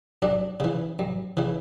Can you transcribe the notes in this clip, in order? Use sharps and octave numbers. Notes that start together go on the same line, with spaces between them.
F#2 D4
C#3 E3
F#2
C#3 E3